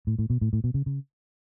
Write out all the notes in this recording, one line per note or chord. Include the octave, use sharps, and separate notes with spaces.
A2
A2
B2
A2
A2
B2
C#3
C#3